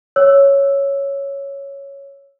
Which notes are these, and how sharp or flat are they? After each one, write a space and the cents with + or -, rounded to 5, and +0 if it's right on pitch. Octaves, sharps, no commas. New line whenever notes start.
C#5 +0 E6 +0